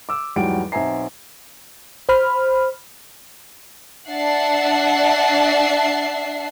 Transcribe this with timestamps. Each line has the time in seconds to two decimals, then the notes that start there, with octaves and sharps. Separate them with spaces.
0.09 D6 E6
0.36 E2 G#2 F#3 G3 G5 D7
0.72 B1 C4 E5 G#5 A#5 C7
2.09 C5 B5 F6
4.08 D4 E5 F#5 A5 C7